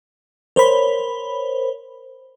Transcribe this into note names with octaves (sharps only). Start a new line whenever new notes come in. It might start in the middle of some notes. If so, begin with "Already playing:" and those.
A#4 C5 C#5 B5